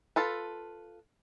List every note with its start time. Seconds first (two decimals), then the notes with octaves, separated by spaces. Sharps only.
0.16 F4 A4 B4